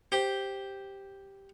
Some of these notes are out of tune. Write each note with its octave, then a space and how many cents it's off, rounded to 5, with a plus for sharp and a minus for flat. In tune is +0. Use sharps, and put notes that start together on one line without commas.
G4 +0 C5 +0